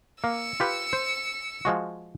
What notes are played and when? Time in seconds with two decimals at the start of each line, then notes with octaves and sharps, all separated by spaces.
0.24 A#3 E6 C#7
0.60 F4 G4 B4
0.93 C5
1.65 F3 G#3 F#4